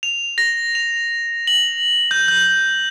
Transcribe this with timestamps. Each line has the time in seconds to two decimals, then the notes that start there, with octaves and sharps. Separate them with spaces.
0.03 F7
0.38 A#6
0.75 F7
1.47 F#7
2.11 G6
2.28 G6